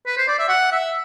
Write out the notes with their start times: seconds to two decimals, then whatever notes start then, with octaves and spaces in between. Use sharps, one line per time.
0.06 B4
0.17 C5
0.28 D5
0.39 E5
0.49 F#5
0.72 E5